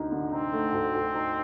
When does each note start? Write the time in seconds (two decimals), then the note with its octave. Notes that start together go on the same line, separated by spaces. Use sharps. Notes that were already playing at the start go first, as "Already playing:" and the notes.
Already playing: D2 D3 D#4
0.12 D3
0.32 C4 D#4
0.53 A3
0.73 D2
0.94 D2
1.15 D#4